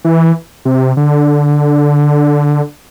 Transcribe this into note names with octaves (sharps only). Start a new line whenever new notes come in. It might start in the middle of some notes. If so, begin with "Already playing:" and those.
E3
C3
D3